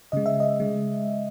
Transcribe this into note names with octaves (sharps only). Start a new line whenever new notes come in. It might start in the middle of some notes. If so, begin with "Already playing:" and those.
C#3 G#3 D#5
E5
D#5
C#3 G#3